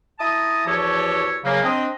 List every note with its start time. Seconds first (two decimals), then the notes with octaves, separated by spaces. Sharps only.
0.20 E4 A5 A#5 D#6
0.67 E2 F3 F#4 G4 A4 C#5
1.44 C#3 F#3 A#3
1.63 C4 D4 D#5